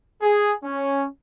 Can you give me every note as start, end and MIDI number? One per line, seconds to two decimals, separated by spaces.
0.22 0.54 68
0.63 1.05 61